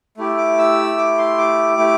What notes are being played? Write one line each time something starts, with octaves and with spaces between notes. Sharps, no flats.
A3 E4 G4
D6
E6
D6
C6
D6
A3 E4 G4